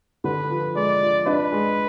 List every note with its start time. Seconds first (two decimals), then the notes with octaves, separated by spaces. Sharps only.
0.24 D3 B4
0.50 F3
0.75 G#3 D5
1.01 F3
1.26 D4 B4
1.52 G#3